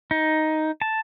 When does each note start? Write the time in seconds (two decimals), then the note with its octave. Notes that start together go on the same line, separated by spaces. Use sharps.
0.11 D#4
0.82 A5